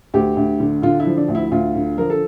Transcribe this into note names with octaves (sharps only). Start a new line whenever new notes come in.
D2 G4
D2
D3
D3 F4
E4
F3
D4
D2
E4
D2 F4
D3
F3 A#4
A4